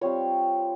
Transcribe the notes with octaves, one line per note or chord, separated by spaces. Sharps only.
G3 C4 F4 C#5